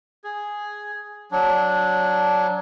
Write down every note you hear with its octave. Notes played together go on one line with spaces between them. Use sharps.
G#4
F#3 D4